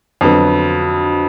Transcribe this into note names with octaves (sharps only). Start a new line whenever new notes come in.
F2 D3 F#3 B3